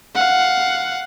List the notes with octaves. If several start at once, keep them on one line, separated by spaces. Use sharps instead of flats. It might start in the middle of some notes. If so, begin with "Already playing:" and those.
F5 F#5